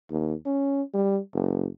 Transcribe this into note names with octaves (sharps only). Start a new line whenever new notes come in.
D#2
C#4
G3
F#1